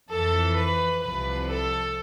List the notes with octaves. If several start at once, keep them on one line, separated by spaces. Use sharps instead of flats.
F2 E3 A4
B4
C2 C3 F3 B4
A4